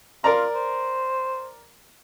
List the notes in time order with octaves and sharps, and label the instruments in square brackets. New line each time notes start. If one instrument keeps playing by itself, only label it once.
[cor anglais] F4 [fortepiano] A#4 D5 A#5
[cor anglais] C5